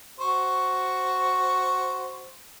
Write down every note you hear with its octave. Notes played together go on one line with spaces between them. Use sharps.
F#4 C5 C#6